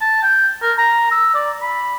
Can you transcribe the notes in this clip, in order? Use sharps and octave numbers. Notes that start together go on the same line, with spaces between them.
A5
G5
A#4
A#5
E6
D5
B5